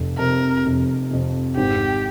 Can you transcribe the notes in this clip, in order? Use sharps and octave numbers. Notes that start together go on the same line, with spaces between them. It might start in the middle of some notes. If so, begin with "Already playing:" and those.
Already playing: F1
F2 C3 A#4
F1
F2 C3
G#1 G4